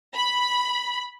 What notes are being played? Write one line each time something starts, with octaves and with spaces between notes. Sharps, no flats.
B5